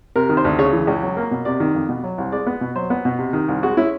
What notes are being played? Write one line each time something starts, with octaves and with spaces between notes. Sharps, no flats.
C3 A#4
D#3
C5
D2
C#3 C#5
E3
C#2
F#3
A#3
B2
C3 D5
D#3
F2
B2
F#3
C2
G#3 D5
B3
B2
F#3 C5
B3
B2
C3
D#3
C2
G#3 F#4
C#4 E4